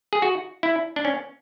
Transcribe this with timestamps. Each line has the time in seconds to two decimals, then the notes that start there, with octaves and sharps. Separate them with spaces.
0.13 G#4
0.22 F#4
0.63 E4
0.96 D4
1.05 C#4